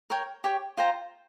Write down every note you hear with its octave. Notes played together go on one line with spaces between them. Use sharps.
A#4 C#5 G5
G4 C#5 G5
F4 C5 G5 A#5